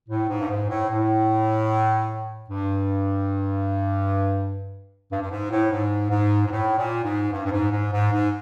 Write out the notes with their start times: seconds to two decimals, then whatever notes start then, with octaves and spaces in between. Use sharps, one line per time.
0.09 A2
0.28 G#2
0.40 G2
0.49 G#2
0.69 A2
0.89 A2
2.49 G2
5.11 G2
5.22 G2
5.31 G#2
5.51 A2
5.71 G#2
6.10 G#2
6.47 G#2
6.51 A2
6.77 A#2
7.04 G#2
7.32 G2
7.44 G2
7.51 G#2
7.71 G#2
7.92 G#2
8.11 G#2